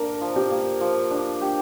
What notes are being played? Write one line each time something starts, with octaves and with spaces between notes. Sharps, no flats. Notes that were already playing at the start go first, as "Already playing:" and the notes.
Already playing: A#3 D4 A#4
F3
G4
A#3
F3
D4
G4